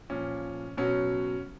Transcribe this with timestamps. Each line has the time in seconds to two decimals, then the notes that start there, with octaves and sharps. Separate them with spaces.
0.10 A#2 F3 C#4
0.77 B2 F#3 C#4